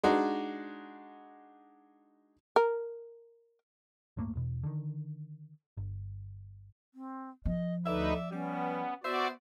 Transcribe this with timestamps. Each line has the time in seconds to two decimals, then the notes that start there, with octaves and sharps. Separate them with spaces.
0.04 G#3 D4 D#4 F#4
2.56 A#4
4.17 D1 G2 A3 A#3
4.35 E2 B2
4.63 D3 D#3
5.77 G1
6.94 C4
7.45 F3 D#5
7.86 D2 D#4 A4 B4 D5 E5
8.31 G3 B3 C#4
9.03 B3 F#4 C5 D5 E5